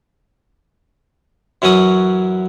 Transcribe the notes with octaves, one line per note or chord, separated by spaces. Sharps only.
F#2 E3 F#3 C#4 D#6